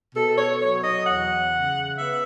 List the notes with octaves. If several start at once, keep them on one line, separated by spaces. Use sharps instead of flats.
B2 A4
C#5
F#3 C#5
D#5
E2 F#5
C#3
B3 E5